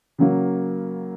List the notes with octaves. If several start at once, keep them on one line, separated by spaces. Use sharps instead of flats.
C#3 F#3 A#3